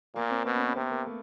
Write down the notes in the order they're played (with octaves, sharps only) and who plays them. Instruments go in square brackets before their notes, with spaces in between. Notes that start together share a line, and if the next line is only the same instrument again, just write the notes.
[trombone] A#2 [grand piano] A#3
[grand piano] C4
[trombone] B2 [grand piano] B3
[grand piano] C#4
C4
[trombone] C3 [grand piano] B3
[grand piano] A#3
A3